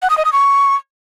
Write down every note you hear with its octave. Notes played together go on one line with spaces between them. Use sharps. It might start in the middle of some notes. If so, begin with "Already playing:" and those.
F#5
D#6
D#5
D#6
C#6